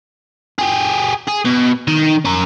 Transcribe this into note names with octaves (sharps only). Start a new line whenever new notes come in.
G4 G#4
G#4
B2
D#3
C#4 A#4